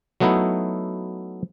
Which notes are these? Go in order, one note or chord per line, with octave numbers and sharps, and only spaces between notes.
F#3 A3 B3 D#4 E4